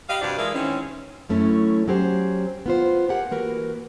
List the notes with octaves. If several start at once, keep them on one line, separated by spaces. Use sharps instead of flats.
G4 B4 D#5 F5
G2 C3 F3 D4 F#4 D5
E3 G#3 E4 G#4 A#4 F5
D#3 E3 G#3 C4 C#4
F#2 E3 A3 C#4 E4 C#5
F#3 C#4 G4 G#4 C5
B3 F4 C5
G4 G#4 A#4 F#5
E3 A#3 F#4 A#4 B4